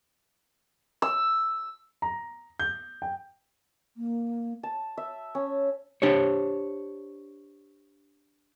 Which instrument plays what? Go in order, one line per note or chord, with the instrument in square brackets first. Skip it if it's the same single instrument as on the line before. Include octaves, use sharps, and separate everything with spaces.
[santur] E6
[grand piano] A#5
G6
G5
[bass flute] A#3
[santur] A5
E5
C#4
[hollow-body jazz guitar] D4 G4 C5 C#5